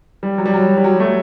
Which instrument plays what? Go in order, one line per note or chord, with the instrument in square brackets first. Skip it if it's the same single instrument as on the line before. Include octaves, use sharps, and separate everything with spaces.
[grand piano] G3
F#3
G3
F#3
G3
F#3
A3